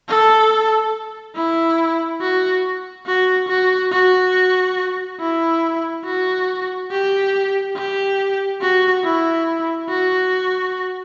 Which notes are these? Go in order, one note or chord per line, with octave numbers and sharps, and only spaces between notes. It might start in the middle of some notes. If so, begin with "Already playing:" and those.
A4
E4
F#4
F#4
F#4
F#4
E4
F#4
G4
G4
F#4
E4
F#4